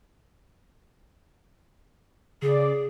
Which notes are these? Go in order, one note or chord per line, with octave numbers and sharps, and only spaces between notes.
C#3 G#4 D5